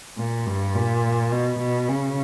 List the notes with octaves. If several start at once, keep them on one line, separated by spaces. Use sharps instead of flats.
A#2
G2
A#2
B2
B2
C#3